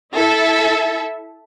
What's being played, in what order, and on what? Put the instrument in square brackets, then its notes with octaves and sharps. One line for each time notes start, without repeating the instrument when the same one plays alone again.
[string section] E4 A4 E5